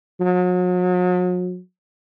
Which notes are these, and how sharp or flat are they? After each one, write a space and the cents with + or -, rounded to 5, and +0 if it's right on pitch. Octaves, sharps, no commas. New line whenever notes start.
F#3 -40